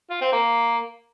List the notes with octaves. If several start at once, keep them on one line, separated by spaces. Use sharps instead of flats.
F4
C4
A#3